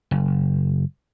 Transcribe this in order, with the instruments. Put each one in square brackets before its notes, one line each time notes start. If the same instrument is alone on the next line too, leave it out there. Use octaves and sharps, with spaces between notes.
[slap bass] F#1